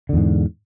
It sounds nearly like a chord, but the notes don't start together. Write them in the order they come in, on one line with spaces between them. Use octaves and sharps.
D3 E2 G#2